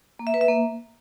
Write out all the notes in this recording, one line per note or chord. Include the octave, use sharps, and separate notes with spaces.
A#3
E5
B4
E5
A#3